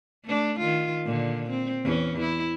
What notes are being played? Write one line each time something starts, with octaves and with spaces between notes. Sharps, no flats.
A3 D4
D#3 F4
A#2 D3
C4
E2 C#4
E4